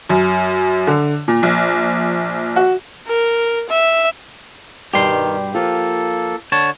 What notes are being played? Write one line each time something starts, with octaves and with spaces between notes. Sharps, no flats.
F#2
D3
A#2
A#1
F#4
A#4
E5
G2 B2 D#3 G3 G4 C6
F3 A#3 F4 A4
D3 C#5 A5